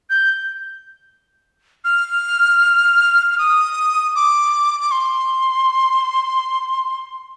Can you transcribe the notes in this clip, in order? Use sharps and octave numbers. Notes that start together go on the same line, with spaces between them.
G6
F6
F6
D#6
D6
D6
C6